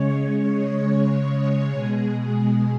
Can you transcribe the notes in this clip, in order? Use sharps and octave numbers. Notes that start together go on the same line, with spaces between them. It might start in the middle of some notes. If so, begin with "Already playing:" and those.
Already playing: C#3 G#3 C#5
C#5
B2 G#3 G#4
G#4